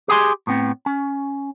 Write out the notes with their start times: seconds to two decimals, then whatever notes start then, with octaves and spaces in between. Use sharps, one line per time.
0.08 G4 G#4 G#5 C6
0.47 A2 B3 C4
0.86 C#4